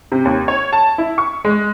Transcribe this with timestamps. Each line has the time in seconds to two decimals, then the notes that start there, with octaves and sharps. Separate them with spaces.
0.12 C3
0.25 D#2
0.48 C#5
0.73 A5
0.98 E4
1.18 C#6
1.45 G#3